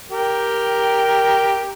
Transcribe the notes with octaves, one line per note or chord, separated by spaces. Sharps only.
G4 A#4 G5